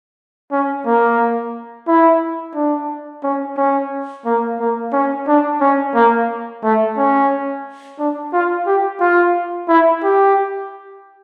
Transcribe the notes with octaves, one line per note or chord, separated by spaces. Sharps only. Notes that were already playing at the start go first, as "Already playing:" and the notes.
C#4
A#3
E4
D4
C#4
C#4
A#3
A#3
C#4
D4
C#4
A#3
A3
C#4
D4
F4
G4
F4
E4
G4